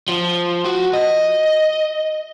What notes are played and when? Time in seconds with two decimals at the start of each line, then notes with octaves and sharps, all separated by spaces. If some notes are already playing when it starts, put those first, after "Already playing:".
0.09 F3
0.65 F#4
0.94 D#5